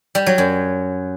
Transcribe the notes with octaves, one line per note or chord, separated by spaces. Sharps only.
G3
F#3
F#2